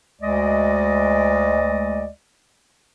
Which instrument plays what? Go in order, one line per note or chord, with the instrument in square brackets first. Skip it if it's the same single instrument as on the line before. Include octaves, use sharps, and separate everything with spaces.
[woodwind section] D2 G#3 D5 D#5